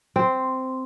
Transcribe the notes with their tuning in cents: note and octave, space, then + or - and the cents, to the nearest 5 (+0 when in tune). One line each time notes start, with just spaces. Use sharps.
C4 -5 C5 +0